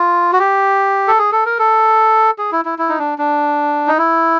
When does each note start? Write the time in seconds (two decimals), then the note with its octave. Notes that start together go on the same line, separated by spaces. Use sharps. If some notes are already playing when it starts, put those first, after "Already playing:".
Already playing: F4
0.33 F#4
0.39 G4
1.08 A4
1.19 G#4
1.32 A4
1.46 A#4
1.59 A4
2.38 G#4
2.52 E4
2.65 E4
2.79 E4
2.89 D#4
2.99 D4
3.18 D4
3.88 D#4
3.98 E4